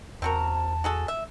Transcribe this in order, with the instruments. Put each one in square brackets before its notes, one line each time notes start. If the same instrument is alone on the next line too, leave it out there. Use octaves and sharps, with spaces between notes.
[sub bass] E2 [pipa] C4 F#4 A#4 [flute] A5
[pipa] F#4 G#4 A4
E5